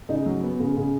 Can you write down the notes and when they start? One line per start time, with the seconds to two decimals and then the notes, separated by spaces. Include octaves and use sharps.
0.09 C#3 D#4
0.26 F#3
0.43 B3
0.60 C#3
0.77 C#3